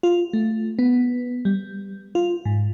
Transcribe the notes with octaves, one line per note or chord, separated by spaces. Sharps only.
F4
A3
B3
G3
F4
G#2